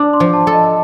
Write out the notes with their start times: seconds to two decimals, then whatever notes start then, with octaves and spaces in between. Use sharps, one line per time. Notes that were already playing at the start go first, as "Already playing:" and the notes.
Already playing: D4 D6
0.13 C6
0.20 F3
0.33 A5
0.47 A4
0.53 D#5